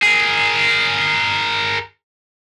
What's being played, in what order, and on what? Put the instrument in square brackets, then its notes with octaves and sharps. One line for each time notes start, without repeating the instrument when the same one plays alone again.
[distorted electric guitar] G#4 A#4